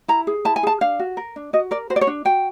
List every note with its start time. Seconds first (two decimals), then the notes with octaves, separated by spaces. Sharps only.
0.08 E4 A#5
0.27 G#4
0.45 E4 A5
0.56 G#5
0.63 G#4 A5
0.81 D4 F5
0.99 F#4
1.17 A#4
1.36 D4
1.53 F#4 D#5
1.71 A#4 D5
1.90 F#4 C5
1.96 D5
2.01 C#5
2.07 D4
2.25 F#4 G5